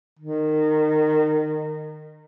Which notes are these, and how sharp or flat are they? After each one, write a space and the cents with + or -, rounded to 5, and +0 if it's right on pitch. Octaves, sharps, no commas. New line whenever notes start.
D#3 -20